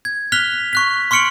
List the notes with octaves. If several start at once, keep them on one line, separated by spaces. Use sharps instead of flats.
G#6
F6 F#6 B6 F7 G7
C#6 F#6 B6
C6 C#6 F6 C#7 D7 F#7